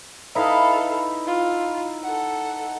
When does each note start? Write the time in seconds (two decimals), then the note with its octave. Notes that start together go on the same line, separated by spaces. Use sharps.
0.35 D#4 E4 A4 B4 F5
1.27 F4
2.03 A4 F#5